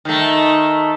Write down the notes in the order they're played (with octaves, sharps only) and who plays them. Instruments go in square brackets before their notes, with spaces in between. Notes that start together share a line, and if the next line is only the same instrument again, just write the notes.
[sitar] D#3 A3